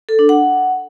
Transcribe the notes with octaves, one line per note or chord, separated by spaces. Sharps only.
A4
D4
F#5